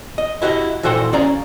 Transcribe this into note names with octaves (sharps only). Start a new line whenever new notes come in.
D#5
E4 F#4 G4 D#5
A#2 E3 F#4 A4 C5 G5
C#4 G#4 D5 F5 A#5